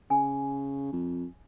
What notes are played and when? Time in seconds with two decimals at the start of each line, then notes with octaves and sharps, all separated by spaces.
0.10 C#3 G#5
0.93 F2